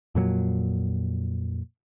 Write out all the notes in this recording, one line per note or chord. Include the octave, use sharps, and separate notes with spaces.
F2 A#2 F#3